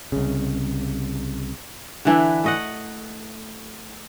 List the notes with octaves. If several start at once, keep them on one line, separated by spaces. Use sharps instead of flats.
C2 C#3
D3 E3 D4 E4
A3 D#5 F#5